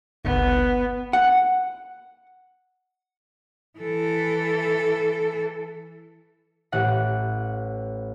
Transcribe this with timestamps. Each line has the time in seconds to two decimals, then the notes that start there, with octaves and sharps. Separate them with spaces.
0.25 G1 C#2 B3
1.13 F#5
3.79 E3 A4
6.72 A1 G4 F#5 C#7